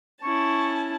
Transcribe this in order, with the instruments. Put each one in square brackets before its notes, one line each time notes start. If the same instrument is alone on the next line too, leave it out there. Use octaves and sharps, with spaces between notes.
[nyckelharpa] C#4 E4 [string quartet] A5 [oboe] C#6